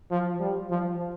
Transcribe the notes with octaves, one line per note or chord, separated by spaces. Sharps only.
F3
G3
F3